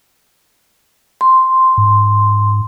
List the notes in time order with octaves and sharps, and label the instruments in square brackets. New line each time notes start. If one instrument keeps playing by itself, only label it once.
[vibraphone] C6
[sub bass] G#2